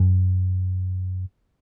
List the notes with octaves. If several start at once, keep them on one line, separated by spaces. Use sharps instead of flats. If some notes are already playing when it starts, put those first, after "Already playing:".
Already playing: F#2